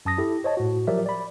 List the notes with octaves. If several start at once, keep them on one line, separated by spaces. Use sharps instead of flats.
F#2 A5 D#6 A#6
E4 G4 A4
C5 C#5 D#5 A5
A2 F#4
F3 F#3 G4 A#4 D5 E5
D5 B5